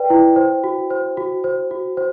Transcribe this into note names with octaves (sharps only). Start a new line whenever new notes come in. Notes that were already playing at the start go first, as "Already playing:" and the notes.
Already playing: B4 D5 G5
E4
C5
F#4
C5
F#4
C5
F#4
C5